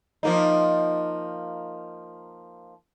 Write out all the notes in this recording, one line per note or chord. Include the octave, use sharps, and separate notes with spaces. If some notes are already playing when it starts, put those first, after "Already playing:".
F3 A#3 D#4